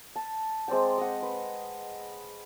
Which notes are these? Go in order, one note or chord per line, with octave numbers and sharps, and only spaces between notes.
A5
G#3 C4 D5 G5
D#5 F#5
B4